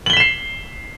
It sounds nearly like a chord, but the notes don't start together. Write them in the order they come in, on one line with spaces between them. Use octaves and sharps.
F#7 G7 B6 E7 C7